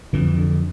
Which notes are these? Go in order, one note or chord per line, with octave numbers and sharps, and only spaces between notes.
F2 D3 E3
D3